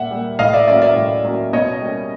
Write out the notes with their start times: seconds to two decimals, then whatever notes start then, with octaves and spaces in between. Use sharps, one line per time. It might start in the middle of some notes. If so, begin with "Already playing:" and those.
Already playing: A#2 G3 A#3 E5 F#5
0.11 G3 A#3
0.39 A2 D#5 F5
0.53 D5 E5
0.68 F#3 A#3 C#4 D5 E5
0.82 D5 E5
0.96 A2
1.25 F#3 A#3 C#4
1.53 B2 C#5 D#5
1.82 G3 A#3 C#4